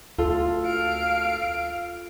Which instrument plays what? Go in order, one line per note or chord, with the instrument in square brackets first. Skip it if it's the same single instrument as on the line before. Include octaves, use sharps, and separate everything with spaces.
[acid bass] D2 [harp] F4 [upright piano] A4
[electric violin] F5 D7